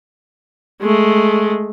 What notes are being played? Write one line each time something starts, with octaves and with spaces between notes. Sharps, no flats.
G#3 A3